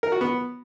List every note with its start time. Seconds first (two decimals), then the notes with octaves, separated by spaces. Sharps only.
0.03 A#4
0.12 F#4
0.21 B3